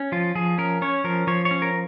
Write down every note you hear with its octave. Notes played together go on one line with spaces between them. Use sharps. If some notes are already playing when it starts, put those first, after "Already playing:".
Already playing: C#4
F3 F4
F3 G#4
C#4 A#4
C#4 C#5
F3 A#4
F3 C#5
C#5
C#4
A#4